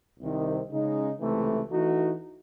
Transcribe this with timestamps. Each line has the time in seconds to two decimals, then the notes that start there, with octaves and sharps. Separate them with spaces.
0.19 C2 C3 D#3
0.70 C#3 G#3 D#4
1.21 C#2 C3 E3 A3
1.71 E3 A3 D#4 F#4